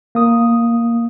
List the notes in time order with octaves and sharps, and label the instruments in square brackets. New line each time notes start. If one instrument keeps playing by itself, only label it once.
[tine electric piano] A#3 D#6